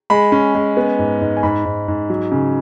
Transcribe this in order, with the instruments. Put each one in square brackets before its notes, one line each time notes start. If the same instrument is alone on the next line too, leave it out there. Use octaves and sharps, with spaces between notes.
[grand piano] G#3 B5
C#4
G#3
B3
G#2
G#2
G#5
G#2 B5
G#2
G#2
F#3
C#3